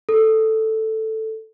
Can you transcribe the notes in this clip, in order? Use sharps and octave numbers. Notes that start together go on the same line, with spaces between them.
A4